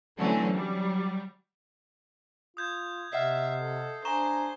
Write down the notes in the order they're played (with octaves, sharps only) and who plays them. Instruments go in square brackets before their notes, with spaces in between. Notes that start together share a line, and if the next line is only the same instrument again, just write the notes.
[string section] D3 E3 F#3 A3 C4 C#4
F#3 G3
[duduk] F4 [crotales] D#6 G6 G#6
[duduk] C3 [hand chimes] D#5 F#5 F6 [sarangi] E5 [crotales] C7
[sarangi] A4
[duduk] D4 [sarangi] C5 [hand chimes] G#5 A#5 [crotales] C#6 E7 G7